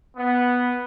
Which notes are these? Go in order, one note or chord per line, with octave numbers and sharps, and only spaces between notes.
B3